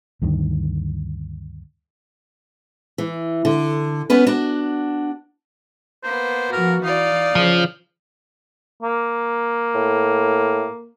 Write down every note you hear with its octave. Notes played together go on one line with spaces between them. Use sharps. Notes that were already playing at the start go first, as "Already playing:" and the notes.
D2 G2 D#3
E3
D3
B3 C#4 B4
D4 F#4
A#3 B3 C5
F3 F#4 A#4
E3 D#4 D5 F5
C#3 F3
A#3
A2